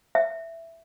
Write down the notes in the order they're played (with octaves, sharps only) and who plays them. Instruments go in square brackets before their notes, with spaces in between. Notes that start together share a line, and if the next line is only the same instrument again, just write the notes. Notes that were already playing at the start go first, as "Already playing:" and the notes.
[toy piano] E5